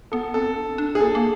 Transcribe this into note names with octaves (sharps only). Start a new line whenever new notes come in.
B3 A4
C4 A4
D4
D4
G#4
A#3 A4
A#3